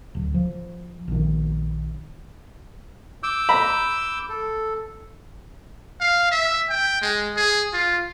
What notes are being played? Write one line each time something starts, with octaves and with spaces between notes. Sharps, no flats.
D1
F3
A#1 D#3
D6 E6 G6
A#5 B5
A4
F5
E5
G5
G#3
G#4
F4